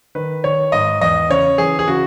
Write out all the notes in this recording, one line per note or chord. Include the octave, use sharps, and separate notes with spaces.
D#3 B4
D#3 C#5
G#2 D#5
E2 D#5
C#3 C#5
E3 G#4
G#4
C#3 F#4